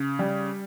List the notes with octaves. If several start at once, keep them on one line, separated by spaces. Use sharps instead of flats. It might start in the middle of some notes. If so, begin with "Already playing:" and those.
Already playing: C#3
G3